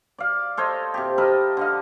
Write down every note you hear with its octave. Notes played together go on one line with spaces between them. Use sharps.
D5 F5
A4 C5 C#5 D#5
C3 G4
A4 A#4 D#5 B5
D3 D#5 F5